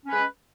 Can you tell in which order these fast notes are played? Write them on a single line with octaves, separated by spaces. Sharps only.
C#4 B4 G#3